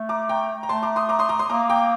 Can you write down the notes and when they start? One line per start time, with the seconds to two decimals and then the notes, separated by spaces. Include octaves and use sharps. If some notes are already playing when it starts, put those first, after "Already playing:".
Already playing: A3
0.09 A#5 D6
0.29 G5 A#5
0.63 A#5
0.69 A3 A5 C6
0.83 A#5 D6
0.96 C6 D#6
1.09 A#5 D6
1.19 C6 D#6
1.29 A#5 D6
1.39 C6 D#6
1.49 A#3 A#5 D6
1.69 G5 A#5